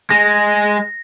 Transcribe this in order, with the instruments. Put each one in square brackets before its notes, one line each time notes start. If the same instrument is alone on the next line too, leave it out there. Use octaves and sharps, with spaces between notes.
[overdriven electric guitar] G#3 [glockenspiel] A#6